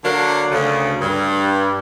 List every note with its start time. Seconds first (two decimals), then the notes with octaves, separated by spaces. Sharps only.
0.03 D3 F#3 A#3 D4
0.52 D2 C#3
1.01 G2